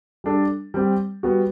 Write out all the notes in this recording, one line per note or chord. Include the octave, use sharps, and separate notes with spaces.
G3 D4 A4
G3 C4 G4
G3 B3 F#4